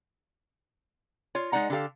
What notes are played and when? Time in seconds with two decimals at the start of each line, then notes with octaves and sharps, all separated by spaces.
1.35 F4 C#5
1.52 G#3 D#4 D5 F#5 A#5
1.70 D3 F4 G4 A4 F5